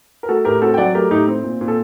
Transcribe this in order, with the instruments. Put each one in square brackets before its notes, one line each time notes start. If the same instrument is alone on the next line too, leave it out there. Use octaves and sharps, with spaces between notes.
[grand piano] A#4
A3 F#4 A4
A2 G4 A#4
C4 F#4 A4
G5
F#3 D5 F#5
A3 G4 A#4
A2 D#4 G4
C4
A#2
A#2
A4